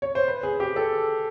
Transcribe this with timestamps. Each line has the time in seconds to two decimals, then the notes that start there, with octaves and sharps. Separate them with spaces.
0.02 C#5
0.15 C5
0.28 B4
0.43 G#4
0.60 G4
0.76 A4